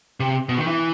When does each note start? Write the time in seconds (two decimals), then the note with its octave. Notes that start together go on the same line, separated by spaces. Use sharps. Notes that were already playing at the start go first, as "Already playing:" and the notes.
0.20 C3
0.49 B2
0.58 D#3
0.67 E3